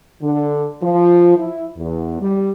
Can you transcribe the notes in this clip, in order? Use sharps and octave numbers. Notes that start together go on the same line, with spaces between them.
D3
F3
E4
E2
G3